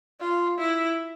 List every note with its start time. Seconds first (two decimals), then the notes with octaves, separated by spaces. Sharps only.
0.20 F4
0.58 E4